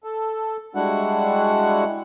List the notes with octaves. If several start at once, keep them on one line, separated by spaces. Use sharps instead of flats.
A4
G3 G#3 D4 E4 F#4 F#5